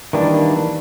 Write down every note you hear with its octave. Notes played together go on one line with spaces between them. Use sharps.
D#3 E3 G3 A#3 D4